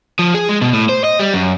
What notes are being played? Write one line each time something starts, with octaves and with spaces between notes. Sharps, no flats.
F3
G#4
G#3
B2
A2
C5
D#5
G3
F#2